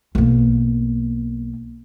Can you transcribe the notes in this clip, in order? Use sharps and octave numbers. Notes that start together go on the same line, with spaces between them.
B1 A#3